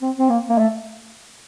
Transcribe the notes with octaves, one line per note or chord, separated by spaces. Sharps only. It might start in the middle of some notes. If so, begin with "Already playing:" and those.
C4
C4
A#3
A#3
A3